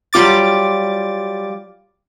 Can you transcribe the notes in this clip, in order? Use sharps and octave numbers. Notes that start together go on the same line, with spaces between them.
F#3 G3 F4 D6 A6